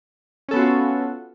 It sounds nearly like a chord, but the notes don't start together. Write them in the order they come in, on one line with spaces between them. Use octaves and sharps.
C#4 A4 B3 F#4 F4